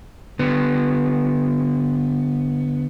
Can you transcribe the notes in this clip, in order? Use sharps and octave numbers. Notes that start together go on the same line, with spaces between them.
D3 B3